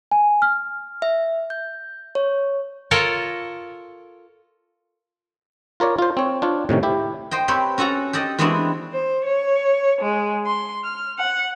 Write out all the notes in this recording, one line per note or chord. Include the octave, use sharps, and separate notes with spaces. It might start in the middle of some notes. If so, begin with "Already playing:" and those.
G#5
F6
E5
G6
C#5
F4 A4 A#4 C#5
F4 A#4 C#5 D5
F4 C5
C4 C#5
D4 F4 C#5
A2 C3 D#3 C#4
E4 G4
C5 D#5 G5
C4 G4 B4 C#5
C#4 F#4 A4 F#5 A#5
G4 A4 D5 D#5
E3 G#3 B3 C4 D4 F#4
C5
C#5
G#3
C6
F6
F#5